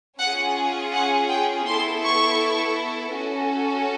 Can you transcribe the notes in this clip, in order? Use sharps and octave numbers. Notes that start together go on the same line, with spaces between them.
C#4 F4 G#4 F#5
F#5
G5
B3 E4 A4 C6
C#6
C#4 F#4 A4